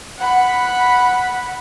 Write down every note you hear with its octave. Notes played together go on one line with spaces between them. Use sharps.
F#5 B5